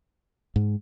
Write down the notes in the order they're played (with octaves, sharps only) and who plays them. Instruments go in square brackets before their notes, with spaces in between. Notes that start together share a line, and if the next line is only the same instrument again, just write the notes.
[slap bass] G#2